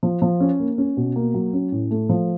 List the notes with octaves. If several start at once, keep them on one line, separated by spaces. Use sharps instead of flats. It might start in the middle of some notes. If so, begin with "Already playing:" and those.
F3
F3
C#4
A#3
C#4
B2
A#3
F#3
C#4
A2
A3
F3